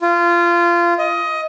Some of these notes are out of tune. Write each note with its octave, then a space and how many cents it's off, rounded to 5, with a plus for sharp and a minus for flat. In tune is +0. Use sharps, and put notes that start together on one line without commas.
F4 -20
D#5 +20